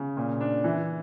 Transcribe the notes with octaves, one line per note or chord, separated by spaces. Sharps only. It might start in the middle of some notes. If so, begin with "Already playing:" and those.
Already playing: C#3
A#2
D4
E3